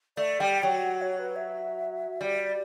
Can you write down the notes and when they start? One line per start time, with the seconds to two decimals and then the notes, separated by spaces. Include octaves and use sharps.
0.17 A3 D5
0.40 G3 G5
0.62 F#3 G5
0.85 F#5
1.02 C#5
1.19 B4
1.36 E5
2.20 G3 D5